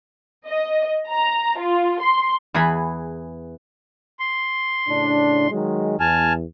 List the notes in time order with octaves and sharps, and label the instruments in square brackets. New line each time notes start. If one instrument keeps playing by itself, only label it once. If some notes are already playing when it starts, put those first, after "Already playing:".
[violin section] D#5
A#5
F4
C6
[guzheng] E2 E3 G#4 G#5 B5
[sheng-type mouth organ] C6
[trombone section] A2 C#3 D4
D#3 F#3 G#3
[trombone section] E2 [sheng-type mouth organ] G#5 A5 F6